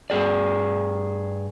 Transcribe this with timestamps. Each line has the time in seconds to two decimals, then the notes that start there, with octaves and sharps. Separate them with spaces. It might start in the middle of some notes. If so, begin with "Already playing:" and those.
0.10 G2 G#4 D5